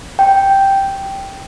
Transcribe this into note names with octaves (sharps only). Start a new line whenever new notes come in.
G5